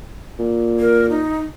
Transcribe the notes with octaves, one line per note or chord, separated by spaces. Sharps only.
A#2
A#4
D#4